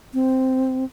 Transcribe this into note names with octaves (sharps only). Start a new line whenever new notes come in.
C4